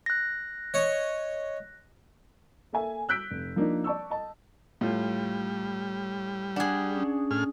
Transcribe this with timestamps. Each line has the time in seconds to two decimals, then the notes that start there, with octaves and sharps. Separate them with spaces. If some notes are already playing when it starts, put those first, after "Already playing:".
0.06 F#6 A#6
0.74 C#5 D#5
2.73 A#3 A4 E5 G#5
3.09 E6 F#6 G6 B6 D7
3.31 F1
3.56 F3 A#3 D4 D#4
3.84 D5 A5 C#6 E6
4.10 D#5 A5
4.81 A2 G3 F4
6.56 D4 G#4 F#5
6.96 C#4
7.31 A2 G#4 F6